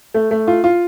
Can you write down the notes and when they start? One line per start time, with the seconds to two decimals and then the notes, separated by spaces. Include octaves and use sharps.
0.14 A3
0.31 A3
0.47 F4
0.64 F4